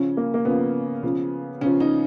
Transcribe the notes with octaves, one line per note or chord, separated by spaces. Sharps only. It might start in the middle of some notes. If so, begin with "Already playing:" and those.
Already playing: C#3 F3 C#4
A#3
A#3
C#3 F3 B3
C#3 F3
C#3 F3 C#4
D#4